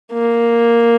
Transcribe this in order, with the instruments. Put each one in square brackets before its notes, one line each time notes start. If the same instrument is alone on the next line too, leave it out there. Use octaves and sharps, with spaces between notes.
[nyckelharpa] A#3